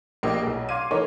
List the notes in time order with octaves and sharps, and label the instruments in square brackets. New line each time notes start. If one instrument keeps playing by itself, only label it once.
[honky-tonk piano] A#1 A#3 D4 G4 D#5
B1 G#4
F5 C6 D6 G#6 D#7
E3 A3 D#4 A#4 C#5